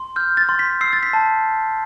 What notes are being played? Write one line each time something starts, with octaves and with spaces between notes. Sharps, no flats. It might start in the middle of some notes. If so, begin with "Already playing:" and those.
Already playing: C6
F6 G6
A6
C6
B6
E6 C7
A6
B6
A5